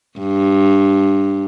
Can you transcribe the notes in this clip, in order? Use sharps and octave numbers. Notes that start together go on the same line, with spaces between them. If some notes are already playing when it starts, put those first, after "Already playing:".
G2